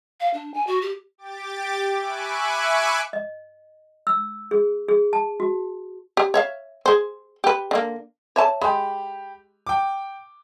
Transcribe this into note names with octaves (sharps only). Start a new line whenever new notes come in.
F5
D4
G#5
F#4
G4
G4 D6 A6
E5 G#5 B5 C#6 D6 F#6
D#5
E6
G#4
G#4
A5
F#4
G4
C#5 E5 F5
G#4 C5
G4 B4
D3 A#3
C#5 E5 A5
G#3 G4 B5
G5 D6